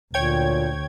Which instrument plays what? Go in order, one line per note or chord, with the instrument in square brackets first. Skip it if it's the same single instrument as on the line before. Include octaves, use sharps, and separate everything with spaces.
[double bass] D2 [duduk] A#2 [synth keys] C#5 G5 G#6